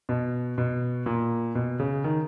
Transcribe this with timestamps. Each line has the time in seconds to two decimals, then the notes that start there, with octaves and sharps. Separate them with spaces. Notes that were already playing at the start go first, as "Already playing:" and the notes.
0.09 B2
0.58 B2
1.06 A#2
1.55 B2
1.80 C#3
2.04 D#3